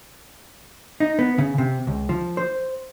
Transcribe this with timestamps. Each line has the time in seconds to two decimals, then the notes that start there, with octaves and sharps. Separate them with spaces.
1.00 D#4
1.19 B3
1.38 C#3
1.58 C3
1.87 C#2
2.09 F3
2.37 C5